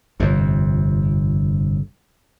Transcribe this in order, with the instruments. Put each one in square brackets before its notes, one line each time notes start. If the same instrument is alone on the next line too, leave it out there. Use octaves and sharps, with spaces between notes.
[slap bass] G1 F2 C3